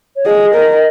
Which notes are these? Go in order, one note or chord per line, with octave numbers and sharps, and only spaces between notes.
C#5
G#4 D#5
A#4